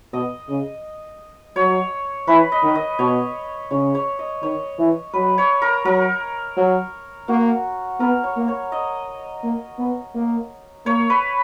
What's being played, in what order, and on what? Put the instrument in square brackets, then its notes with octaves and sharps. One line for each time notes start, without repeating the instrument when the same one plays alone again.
[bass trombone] B2 [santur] D#5
[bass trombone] C#3
[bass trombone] F#3 [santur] C#5
[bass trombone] E3 [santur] B4
[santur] D#5
[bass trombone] D#3
[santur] D#5
[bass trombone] B2 [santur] C#5
[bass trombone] C#3 [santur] C#5
[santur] C#5
D#5
[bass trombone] D#3 [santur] C#5
[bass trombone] E3
[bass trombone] F#3 [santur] B4
[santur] C#5
A#4
[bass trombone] F#3 [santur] A#4
[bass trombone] F#3
[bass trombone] A#3 [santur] F#4
[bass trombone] B3 [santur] A#4
[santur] C#5
[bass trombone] A#3
[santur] C#5
D#5
[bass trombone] A#3
B3
A#3
[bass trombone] A#3 [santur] C#5
[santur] B4